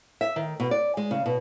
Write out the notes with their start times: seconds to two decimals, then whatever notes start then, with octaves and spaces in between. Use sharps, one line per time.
0.21 E5
0.36 D#3
0.60 B2
0.71 D5
0.97 G#3
1.11 C#3
1.26 B2